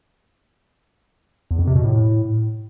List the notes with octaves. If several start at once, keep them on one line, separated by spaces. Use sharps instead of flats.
E2
F2
C3
B2
A2